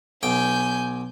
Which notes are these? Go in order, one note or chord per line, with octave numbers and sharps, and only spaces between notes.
B1 G5 G#5 G6